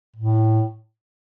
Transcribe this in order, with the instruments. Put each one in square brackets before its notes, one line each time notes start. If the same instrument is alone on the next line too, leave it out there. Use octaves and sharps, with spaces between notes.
[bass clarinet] A2